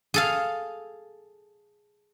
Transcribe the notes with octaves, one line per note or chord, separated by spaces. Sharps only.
G#4 A4 F5